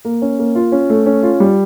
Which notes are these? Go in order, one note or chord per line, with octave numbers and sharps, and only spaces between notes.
A#3
C#4
A#3
F4
C#4
A3
C#4
F4
G3